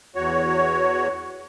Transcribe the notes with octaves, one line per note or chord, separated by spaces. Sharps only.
E2 F#4 C#5